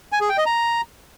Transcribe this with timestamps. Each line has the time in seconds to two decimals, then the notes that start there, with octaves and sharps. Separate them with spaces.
0.12 G#5
0.21 G#4
0.29 G5
0.38 D#5
0.46 A#5